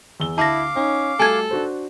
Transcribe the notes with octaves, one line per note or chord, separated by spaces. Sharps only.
E2 E6 G7
D2 E4 F5 A5 D6 A#6
C#4 D#4
G3 A3 F#4 A4 G#5 A5 G#6
D4 F#4 C5